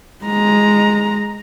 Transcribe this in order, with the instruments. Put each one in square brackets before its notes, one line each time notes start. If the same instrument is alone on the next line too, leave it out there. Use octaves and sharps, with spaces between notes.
[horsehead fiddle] G#3 A#5